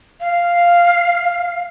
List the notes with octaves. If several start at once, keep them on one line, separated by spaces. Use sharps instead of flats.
F5